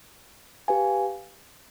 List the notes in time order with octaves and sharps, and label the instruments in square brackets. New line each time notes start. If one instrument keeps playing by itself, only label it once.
[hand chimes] G4 B4 F5 G#5